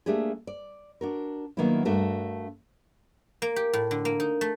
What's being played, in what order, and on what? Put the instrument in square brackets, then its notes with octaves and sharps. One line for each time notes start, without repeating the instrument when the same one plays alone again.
[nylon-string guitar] A3 A#3 D4 G4 G#4
D5
D4 F#4 A#4
D#3 F#3 A#3 B3 D4 E4
G2 A3 D4 F#4 A#4 A5
[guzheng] A#3
G4
A2
D3
A#3
D#4
A3